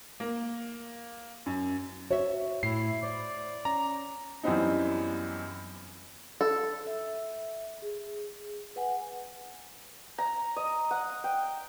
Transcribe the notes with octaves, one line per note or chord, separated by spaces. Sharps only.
A#3
F#2
F#4 C#5 E5
A2 E4 C7
C5 D5
C#4 A#5
F#2 E3 G3 B3 C4 D#4
A4
E5
G#4
B4 F#5 G#5
A#5
D#5
F#5
G5